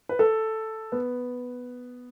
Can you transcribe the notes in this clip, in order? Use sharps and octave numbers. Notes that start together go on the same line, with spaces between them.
B4
A4
B3